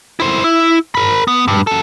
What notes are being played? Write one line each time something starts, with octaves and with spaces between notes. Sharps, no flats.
E4 C5
E4
A#4 B5
B3
G2
F#3 A4